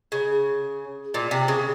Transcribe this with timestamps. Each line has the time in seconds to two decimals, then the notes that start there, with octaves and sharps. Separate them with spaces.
0.12 C#3
1.14 A#2
1.31 C3
1.48 C#3